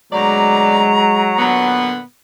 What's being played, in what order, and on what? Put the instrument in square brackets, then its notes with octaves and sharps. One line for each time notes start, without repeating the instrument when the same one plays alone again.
[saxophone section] D2 B2 D5 [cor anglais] F#3 [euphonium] G#3 [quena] A#5
[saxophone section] A#2 D3 B3